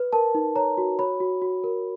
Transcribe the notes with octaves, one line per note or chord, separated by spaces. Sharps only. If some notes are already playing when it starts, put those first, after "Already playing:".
Already playing: B4
A#4 A5
D#4
C#5 A#5
F#4
C#5 B5
F#4
F#4
A#4